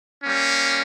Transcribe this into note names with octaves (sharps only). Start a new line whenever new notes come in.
G3 A#3 C#4